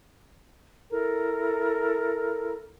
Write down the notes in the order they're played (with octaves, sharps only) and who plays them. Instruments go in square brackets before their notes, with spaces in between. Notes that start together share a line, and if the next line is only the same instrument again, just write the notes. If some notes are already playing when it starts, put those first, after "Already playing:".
[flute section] E4 A4 A#4 A#5